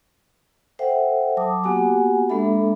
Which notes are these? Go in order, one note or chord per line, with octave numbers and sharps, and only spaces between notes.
A4 C5 E5 F#5 G5
F#3 A5 D6 D#6
A#3 B3 F#4 G4 F#5 G#5
G#3 A#3 D4 A4 E5 B5